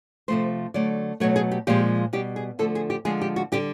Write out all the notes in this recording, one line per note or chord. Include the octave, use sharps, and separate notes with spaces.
C3 F3 A3 C5
D3 F#3 A3 D5
B2 F#3 A3 C#5
G#4
G4
A#2 F3 G#3 G4
B2 G3 G4
G#4
D3 F3 A3 A4
G#4
G4
D3 F3 G#3 G#4
G4
F#4
D3 G3 G4